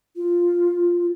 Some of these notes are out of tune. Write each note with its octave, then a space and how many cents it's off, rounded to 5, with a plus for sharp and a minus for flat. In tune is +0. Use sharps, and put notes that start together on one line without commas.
F4 +0